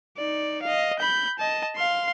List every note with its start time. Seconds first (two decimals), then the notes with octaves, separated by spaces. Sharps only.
0.18 D#4 D5
0.62 D#5 F5
0.99 B5 G6
1.39 D#5 A5
1.76 F5 C6